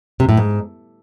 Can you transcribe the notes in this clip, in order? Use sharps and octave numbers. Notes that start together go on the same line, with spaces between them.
C3
A2
G#2